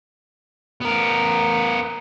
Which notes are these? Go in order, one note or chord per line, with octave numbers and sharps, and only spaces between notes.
B3 A#4